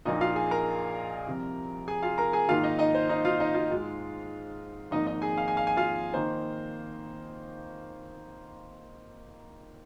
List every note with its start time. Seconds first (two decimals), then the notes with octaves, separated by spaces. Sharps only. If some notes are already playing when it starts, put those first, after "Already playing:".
0.05 A#1 A#2 A#3 D#4 F4 D#5
0.21 F4 F5
0.35 G#4 G#5
0.51 A#4 A#5
1.27 C2 C3 F3
1.88 G#4 G#5
2.03 F4 F5
2.18 A#4 A#5
2.33 G#4 G#5
2.49 G#2 D#3 A#3 F4 F5
2.63 D#4 D#5
2.79 D#4 D#5
2.94 C5
3.09 D#4 D#5
3.25 F4 F5
3.40 D#4 D#5
3.54 F4 F5
3.70 G#2 G#3 F4
4.91 G#1 G#2 F3 A#3 D#4 D#5
5.07 D#4 D#5
5.22 G#4 G#5
5.38 F5
5.48 G#5
5.57 F5
5.67 G#5
5.77 F4 F5
6.13 D#3 A#3 D#4 C5